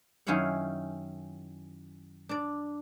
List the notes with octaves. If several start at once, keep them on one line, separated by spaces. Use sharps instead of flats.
F#2 D#3 C#4 E4 F5 F#5
D4 D5